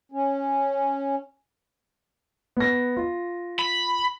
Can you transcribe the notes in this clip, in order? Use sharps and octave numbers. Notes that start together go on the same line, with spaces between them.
C#4
B3 A#6
F4
B5